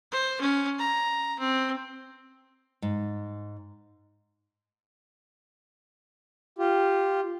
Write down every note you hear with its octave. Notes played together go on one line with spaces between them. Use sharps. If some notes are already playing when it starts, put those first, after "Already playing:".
C5
C#4
A#5
C4
G#2
F4 G4